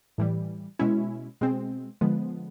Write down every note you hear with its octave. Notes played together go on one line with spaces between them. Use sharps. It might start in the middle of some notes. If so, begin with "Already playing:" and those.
A2 E3 G3
B2 G#3 C#4 E4
B2 G#3 C4
D3 F3 G#3 B3